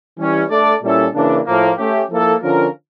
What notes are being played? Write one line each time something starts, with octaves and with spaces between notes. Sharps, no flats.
E3 G3 C#4
A3 D4 A4 D5
A#2 G3 C#4 E4 A4
C#3 E3 A#3 D4
A2 F3 A#3
A3 C#4 G4
F3 A#3 E4 A4
D3 F3 C#4 F4 A#4